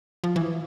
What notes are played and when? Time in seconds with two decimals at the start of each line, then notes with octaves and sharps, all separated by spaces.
0.24 F3
0.36 E3